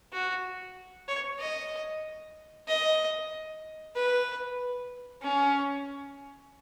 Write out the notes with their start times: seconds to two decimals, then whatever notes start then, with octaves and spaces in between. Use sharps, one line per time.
0.13 F#4
1.08 C#5
1.39 D#5
2.68 D#5
3.96 B4
5.22 C#4